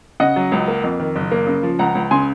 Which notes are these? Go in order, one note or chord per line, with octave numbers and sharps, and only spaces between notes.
C#3 D#5 F#5
F#3
C#2
A#3
F2
D#3
F#1
A#3
C#3
F3
C#2 F#5 A#5
C#2
C#3 G#5 C6